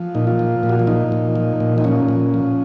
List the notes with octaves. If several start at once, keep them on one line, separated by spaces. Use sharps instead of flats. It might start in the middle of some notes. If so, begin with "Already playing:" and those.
Already playing: F3
A#2 D#4
F4
F3
A#2
F#4
F4
F3 D#4
A#2
F3
A#2
D#4
F3 C#4
A#2
F3